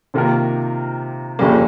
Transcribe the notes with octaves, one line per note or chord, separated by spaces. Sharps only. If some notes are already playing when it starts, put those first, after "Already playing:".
C3 D#3 A#3 F4 A#4
G1 F2 C#3 G3 A#3